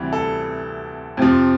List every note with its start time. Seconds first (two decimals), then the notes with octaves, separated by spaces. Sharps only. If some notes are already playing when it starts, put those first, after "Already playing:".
Already playing: D2 C3 E3 G3
0.13 A4
1.17 F2 C3 F3